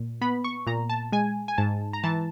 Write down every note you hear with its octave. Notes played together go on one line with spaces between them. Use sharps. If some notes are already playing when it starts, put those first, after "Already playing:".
Already playing: A#2
B3 B5
C#6
A#2 A#5
A5
G#3 G#5
G#5
G#2 A5
A#5
E3 A5